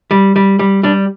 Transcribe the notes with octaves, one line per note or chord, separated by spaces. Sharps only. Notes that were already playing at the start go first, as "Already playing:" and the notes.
G3
G3
G3
G3 D4